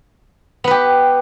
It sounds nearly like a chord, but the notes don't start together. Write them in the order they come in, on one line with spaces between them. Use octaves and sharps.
B3 B4 G4